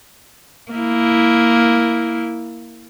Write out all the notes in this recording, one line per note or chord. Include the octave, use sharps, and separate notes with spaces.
A#3 E4